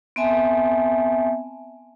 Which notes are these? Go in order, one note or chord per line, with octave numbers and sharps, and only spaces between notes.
B3 C4 E5 G#5 A5